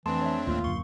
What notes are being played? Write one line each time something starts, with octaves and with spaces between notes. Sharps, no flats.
F2 E3 A3 C4 D4 A5 C6
C#5 E5
D1 D#2 A3 A#3 F4
D#1 F#2 D3 C6 C#6